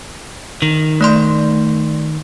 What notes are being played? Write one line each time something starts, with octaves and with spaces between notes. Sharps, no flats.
D#3
A3 D5 C6